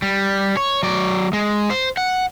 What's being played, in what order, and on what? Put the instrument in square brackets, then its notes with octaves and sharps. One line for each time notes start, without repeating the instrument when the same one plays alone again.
[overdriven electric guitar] G3
C#5
F#3 D5
G#3
C5
F#5